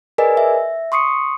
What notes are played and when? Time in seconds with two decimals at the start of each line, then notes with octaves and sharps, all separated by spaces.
0.18 G#4 A#4 B4 D5 D#5 G#5
0.37 E5
0.92 C6 C#6 D#6 C7 C#7